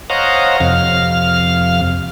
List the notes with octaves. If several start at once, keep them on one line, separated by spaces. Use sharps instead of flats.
C5 C#5 D#5 F5 F#5 A#5
F2 C3 F5 F6